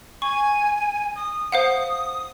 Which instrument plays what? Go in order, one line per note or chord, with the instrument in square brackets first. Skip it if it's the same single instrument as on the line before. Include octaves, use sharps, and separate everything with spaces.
[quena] G#5 [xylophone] C#6
[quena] D#6
[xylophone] C5 F5 F#5 [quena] D#6